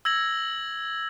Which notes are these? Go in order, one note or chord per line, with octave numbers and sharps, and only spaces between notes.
E6 G#6 A#6 F#7